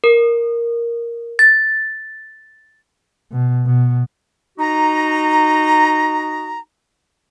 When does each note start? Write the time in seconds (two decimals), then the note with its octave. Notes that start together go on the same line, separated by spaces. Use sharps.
0.04 A#4
1.39 A6
3.31 B2
3.66 B2
4.59 D#4 F#4 A#5